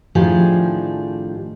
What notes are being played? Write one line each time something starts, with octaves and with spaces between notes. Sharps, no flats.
A2 D#3 F3 D4 G4 G#4